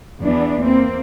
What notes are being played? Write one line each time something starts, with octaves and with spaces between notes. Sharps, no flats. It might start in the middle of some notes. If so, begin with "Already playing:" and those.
E2 E3 B3 D4
A#3 C4